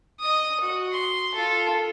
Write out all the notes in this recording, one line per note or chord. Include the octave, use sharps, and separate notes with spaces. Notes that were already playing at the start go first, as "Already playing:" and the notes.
D#5 D#6
F#4
C6
F4 A4